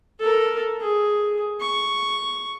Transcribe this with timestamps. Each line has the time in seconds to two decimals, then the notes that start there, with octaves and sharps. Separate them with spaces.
0.19 A4 A#4
0.81 G#4
1.60 C#6